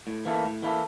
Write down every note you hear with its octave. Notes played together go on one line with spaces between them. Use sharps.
A2
E3 A#3 E4 A4
A2
E3 A#3 E4 A4